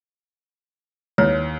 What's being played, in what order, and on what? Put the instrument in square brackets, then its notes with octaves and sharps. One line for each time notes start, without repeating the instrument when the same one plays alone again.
[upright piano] D#2 [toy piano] E4 B4 C#5